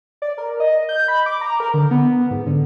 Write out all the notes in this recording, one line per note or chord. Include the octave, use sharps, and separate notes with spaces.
D5
A#4
D#5
G6
B5
D6
A#5
A#4
D3
B3
G#2
D3